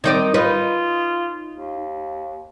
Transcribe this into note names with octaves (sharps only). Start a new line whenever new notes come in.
D#3 C4 D#4 D5
D#4 F4 B4
D#2